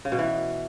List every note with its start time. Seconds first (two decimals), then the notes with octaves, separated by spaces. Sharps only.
0.05 C#3
0.12 B2
0.19 E3